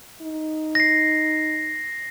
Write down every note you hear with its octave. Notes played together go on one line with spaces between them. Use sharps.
D#4
A#6 C7